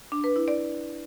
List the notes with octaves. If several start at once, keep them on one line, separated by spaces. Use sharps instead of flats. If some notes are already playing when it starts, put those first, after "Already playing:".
D4
B4
E4
D5